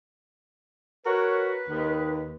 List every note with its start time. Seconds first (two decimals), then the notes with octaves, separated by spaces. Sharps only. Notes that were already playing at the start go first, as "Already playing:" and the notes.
1.06 F#4 A#4 B4 C#5
1.69 D#2 D#3